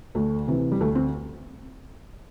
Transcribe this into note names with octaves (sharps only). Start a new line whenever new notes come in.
D2 A3
C3 E3
G3
D2 A3
C4